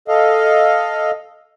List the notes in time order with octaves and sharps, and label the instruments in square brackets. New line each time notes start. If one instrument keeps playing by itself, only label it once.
[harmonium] A4 D#5 F5